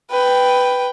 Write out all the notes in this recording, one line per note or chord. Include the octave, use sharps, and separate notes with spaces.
B4 G5